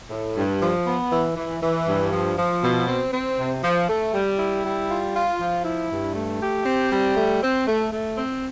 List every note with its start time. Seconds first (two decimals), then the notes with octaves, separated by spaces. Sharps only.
0.10 A2
0.36 G2
0.61 F3
0.87 B3
1.11 E3
1.36 E3
1.62 E3
1.87 G2
2.11 F3
2.38 F3
2.63 B2
2.87 C4
3.12 C4
3.38 C3
3.63 F3
3.89 A3
4.13 G3
4.39 E4
4.65 G3
4.89 F4
5.15 F4
5.40 F3
5.65 E4
5.91 G2
6.15 A3
6.40 G4
6.65 C4
6.91 G3
7.16 A3
7.42 C4
7.67 A3
7.92 A3
8.17 C4